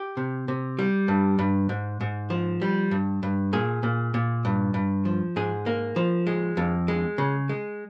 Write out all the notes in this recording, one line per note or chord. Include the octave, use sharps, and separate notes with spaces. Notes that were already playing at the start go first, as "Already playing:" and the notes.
Already playing: G4
C3
C3
G3
G2
G2
G#2
G#2
F3
G3
G2
G2
A#2 G#4
A#2
A#2
G2
G2
F3
G#2 G#4
A#3
F3
G#3
F2
G#3
C#3
G#3